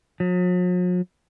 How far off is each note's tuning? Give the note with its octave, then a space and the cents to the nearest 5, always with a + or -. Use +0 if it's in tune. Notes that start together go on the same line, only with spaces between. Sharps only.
F#3 -45